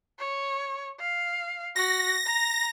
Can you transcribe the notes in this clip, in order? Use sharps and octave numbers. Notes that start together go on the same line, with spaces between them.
C#5
F5
F#4 A#6
A#5